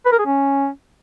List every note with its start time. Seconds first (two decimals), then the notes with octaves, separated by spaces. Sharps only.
0.06 B4
0.13 A#4
0.19 G#4
0.26 C#4